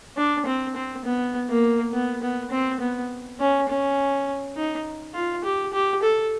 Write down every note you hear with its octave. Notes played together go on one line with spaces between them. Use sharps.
D4
C4
C4
B3
A#3
B3
B3
C4
B3
C#4
C#4
D#4
F4
G4
G4
A4